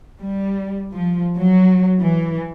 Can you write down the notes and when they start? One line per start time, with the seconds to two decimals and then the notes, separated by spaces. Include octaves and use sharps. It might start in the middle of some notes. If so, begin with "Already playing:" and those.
0.20 G3
0.94 F3
1.37 F#3
2.01 E3